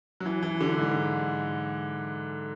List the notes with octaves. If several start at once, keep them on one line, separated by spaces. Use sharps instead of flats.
F#3
E3
E3
D3
G#2